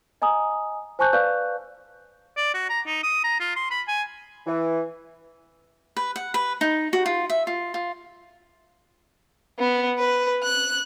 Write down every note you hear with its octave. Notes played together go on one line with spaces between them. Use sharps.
D#5 G#5 A#5 D#6
C5 G#5 A5 C#6 F#6 G6
B4 D5 F5 C#6 F#6 G6
D5
F#4
A#5
D#4
D#6
A#5
F4
C6
B5
G#5
E3
B4
F#5
B4
D#4
F#4
F4
E5
F4
F4
B3
B4
F#6